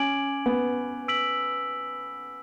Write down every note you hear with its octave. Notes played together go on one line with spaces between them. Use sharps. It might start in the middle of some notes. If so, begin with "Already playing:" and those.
Already playing: C#4 G#5 D6 G#6 D7 F#7
B3
E6 B6 D7 F#7